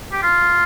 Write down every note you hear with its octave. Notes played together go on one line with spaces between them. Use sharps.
G4
F4